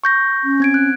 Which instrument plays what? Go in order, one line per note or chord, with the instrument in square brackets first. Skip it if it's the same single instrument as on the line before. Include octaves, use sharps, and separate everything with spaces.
[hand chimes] C#6 G6 A#6
[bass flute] C#4
[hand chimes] C4 G#6 D7
F#6